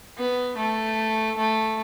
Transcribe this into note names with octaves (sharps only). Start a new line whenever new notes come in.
B3
A3
A3